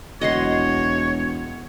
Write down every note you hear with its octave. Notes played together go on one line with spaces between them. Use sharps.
E1 F#4 C#5 D#5 F#5 C6